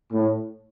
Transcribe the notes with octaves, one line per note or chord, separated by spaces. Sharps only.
A2